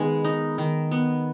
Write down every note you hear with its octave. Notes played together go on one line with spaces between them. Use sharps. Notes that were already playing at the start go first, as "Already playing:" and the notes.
Already playing: D#3 G#3 B3
D#4
D#3
B3